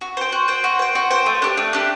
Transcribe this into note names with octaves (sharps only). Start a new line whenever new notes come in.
F#4
C5 G5
F#4
C5 G5
F#4
C5 G5
F#4
C5 G5
A3
D4 G4
A3
D4 G4